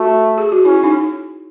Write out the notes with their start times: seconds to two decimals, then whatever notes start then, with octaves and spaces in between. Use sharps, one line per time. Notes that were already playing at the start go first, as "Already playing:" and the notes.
Already playing: A3 F#4
0.38 G#4
0.52 F#4
0.65 C#4 E4
0.83 D#4